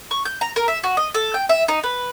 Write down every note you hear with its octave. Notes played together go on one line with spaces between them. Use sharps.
C#6
G6
A#5
A#4
E5
F#4
D#5
A4
G5
E5
D#4
B4